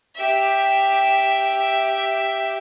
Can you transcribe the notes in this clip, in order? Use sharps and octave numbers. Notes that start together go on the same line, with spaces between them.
G4 E5